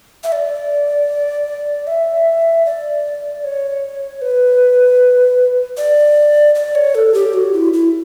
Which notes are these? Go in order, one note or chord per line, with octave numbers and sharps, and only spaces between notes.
E5
D5
E5
D5
C#5
B4
D5
D5
C#5
A4
G4
F#4
E4
E4